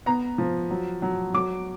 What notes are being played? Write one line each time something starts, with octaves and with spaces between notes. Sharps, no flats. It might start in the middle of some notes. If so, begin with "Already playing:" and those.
B3 A#5
F3
F#3
F#3
F#3 D6